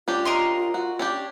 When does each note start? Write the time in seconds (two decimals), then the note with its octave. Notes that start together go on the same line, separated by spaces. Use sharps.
0.08 C#4 D4 F4 G4
0.25 A#4 D#5 C6
0.74 F#4
0.99 C#4 D4 G4